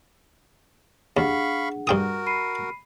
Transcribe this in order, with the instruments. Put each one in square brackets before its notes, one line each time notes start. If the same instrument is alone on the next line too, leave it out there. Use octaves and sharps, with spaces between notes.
[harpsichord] D#2 [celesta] D4 G#4 F#5 [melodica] F5 B5 C#6
[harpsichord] G2 G5 D#6 [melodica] F#4 A#4
[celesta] B5 C7 D#7